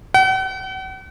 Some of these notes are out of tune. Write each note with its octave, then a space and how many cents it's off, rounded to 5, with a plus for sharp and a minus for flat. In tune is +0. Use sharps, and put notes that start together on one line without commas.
F#5 +45